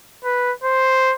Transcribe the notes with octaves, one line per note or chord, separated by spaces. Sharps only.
B4
C5